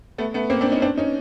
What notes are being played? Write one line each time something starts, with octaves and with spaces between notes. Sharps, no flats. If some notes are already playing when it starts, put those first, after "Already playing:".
A3 B3
A3 B3
A#3 C4
C4 D4
C#4 D#4
C4 D4
C#4 D#4